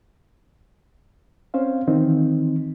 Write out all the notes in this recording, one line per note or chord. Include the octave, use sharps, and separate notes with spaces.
C4 C#4 C5 F5
D#3 E3 C4 D#4